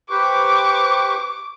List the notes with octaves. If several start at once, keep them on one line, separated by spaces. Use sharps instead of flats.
G4 B4 C5 C#6 D6